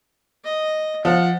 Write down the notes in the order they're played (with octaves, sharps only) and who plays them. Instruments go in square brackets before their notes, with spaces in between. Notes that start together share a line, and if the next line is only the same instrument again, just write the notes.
[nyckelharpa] D#5
[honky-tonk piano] F3 [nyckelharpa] F#5